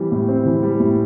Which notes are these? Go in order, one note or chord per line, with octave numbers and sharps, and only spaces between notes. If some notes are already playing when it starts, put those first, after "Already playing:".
Already playing: E3 G3 C4
A2
C4
E3
G3
A2